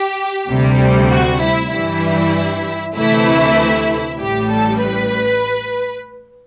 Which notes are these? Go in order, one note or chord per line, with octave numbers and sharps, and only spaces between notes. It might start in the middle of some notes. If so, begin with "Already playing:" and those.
Already playing: G4
D2 C3 G3
F#4
E4
G2 E3 G3 E4
D2 C3 E3 A3 E4
A1 A2 G3 G4
A4
B4